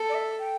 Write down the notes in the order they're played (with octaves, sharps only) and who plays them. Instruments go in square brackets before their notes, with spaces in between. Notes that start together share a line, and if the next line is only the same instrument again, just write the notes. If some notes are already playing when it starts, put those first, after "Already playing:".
Already playing: [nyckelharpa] A4
[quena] D5
E5
G5